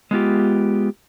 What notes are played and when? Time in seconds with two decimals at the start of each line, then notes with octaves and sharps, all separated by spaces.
0.11 G#3 B3 F4 G4